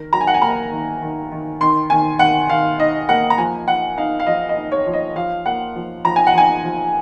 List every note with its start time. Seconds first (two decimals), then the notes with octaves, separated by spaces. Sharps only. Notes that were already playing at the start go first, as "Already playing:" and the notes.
Already playing: D#3 A#4
0.13 F#3 A#5
0.21 G#5
0.27 F#5
0.34 G#5
0.42 A#3 A#5
0.71 D#3
1.02 D#3
1.32 D#3
1.61 D#3 C6
1.90 D#3 G#5
2.19 D#3 F#5
2.49 D#3 F5
2.79 D#4 D#5
3.09 A#3 F#5
3.30 A#5
3.38 F3 G#5
3.68 F3 F#5
3.97 D#4 F5
4.20 F5
4.27 F3 D#5
4.49 D#5
4.56 D#4
4.72 C#5
4.86 F3
4.93 D#5
5.15 F3 F5
5.46 A#3 F#5
5.76 F3
6.05 F3 A#5
6.16 G#5
6.27 F#5
6.34 F3 G#5
6.64 F3